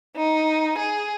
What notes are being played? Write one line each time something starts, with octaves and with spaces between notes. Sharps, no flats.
D#4
G#4